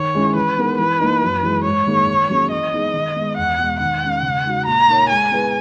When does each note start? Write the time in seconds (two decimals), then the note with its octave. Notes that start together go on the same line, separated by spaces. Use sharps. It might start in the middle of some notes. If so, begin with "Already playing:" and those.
Already playing: D#3 C#5
0.15 G#3 C#4 E4
0.35 E3 B4
0.58 G#3 B3 D#4 A#4
0.78 E3 B4
1.00 A#3 D#4
1.22 F#2
1.43 E3 G#3
1.64 G#2 C#5
1.87 D#3 A#3 D#4 G#4
2.07 D#3
2.30 F#3 A#3 C#4 G#4
2.51 E3 D#5
2.72 G#3 B3 D#4 G#4
2.94 D#3
3.16 G#3 B3
3.37 E2 F#5
3.59 B2 G#3
3.80 D#3 F#5
4.03 G#3 C#4
4.23 C#3
4.45 G#3 D#4 F#4
4.66 A#2 A#5
4.88 A#3 D#4 A#4 C#5
5.10 G#3 G#5
5.32 B3 E4 G#4 B4